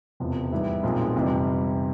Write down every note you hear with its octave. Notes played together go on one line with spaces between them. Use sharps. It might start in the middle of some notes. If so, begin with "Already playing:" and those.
E1 E2 C3 F3
G#2 E3 G3 B3 E4
B1 A#2 F3 G#3 C4
F2 C3 E3 G3